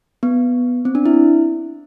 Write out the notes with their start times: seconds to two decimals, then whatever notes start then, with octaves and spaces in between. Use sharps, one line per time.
0.23 B3
0.85 C4
0.95 D4
1.06 E4